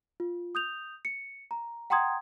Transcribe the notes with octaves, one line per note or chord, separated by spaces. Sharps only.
F4
D#6 G6 F7
C#7
A#5
F#5 G5 A#5 C6 D#6 G#6